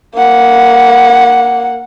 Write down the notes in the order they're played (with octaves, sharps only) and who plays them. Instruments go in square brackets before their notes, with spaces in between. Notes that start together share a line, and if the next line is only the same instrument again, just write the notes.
[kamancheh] A#3 F#5